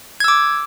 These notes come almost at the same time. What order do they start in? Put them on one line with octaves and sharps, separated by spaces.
G#6 E6 D6